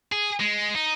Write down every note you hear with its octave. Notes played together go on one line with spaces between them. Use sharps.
G#4
G#3
D#4